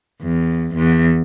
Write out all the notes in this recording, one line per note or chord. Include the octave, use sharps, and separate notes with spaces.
E2
E2